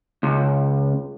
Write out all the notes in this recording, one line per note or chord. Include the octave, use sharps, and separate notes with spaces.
C#2